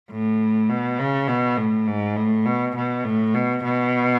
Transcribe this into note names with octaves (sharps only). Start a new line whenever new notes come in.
A2
B2
C#3
B2
A2
G#2
A2
B2
B2
A2
B2
B2